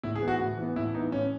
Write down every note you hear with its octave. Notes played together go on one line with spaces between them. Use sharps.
A2 E4
G#4
E3 B3
F#4
A2
E3 B3
A2 E4
E3 B3 D#4
A2 C#4